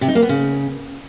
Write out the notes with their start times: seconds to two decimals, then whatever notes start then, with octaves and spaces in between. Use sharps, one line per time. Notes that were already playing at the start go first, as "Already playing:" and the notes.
0.01 C3
0.08 D#4
0.15 A#3
0.22 B3
0.29 C#3